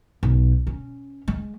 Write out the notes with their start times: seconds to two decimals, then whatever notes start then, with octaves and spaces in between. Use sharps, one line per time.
0.23 B1
0.67 C#4
1.28 G#3